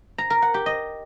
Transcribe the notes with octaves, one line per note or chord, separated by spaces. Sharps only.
A#5
A#4
F#5
G4
D#5